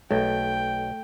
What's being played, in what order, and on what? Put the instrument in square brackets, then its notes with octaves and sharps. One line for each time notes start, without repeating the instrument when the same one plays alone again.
[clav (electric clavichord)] B1 [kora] A3 [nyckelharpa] G5